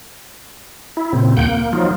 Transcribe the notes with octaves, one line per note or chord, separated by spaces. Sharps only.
E4
A#2 C#3 C4
D#2 A#3 F#5 G5 G6
A#3
F3 F#3 D#4 F4